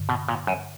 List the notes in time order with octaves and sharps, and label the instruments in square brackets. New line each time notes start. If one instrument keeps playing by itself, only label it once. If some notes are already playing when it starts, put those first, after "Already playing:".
Already playing: [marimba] G2 D3
[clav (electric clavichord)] B2
A#2
F#2